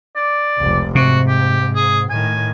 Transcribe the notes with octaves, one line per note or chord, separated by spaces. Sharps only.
D5
F1 C#2
G#2 C3 F#4
G4
G#4
A2 D#3 G#5